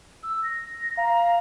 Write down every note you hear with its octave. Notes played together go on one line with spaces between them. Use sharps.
E6
A#6
F5 A#5